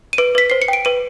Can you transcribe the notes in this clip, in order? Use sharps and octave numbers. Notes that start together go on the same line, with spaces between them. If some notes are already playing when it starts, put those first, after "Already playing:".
D#7
B4 D7
B4 B6
C5 C7
C#7
G5 D7
B4 D#7